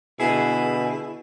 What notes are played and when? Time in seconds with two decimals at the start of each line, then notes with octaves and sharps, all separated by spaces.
0.20 B2 D3 E4 G#4